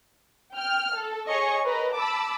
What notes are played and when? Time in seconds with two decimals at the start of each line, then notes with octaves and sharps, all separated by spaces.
0.54 G5 F6
0.95 A4
1.26 G#4 C#5 D#5 C#6
1.65 A#4 B4 D#5 A#5
1.96 A5 B5 D6 E6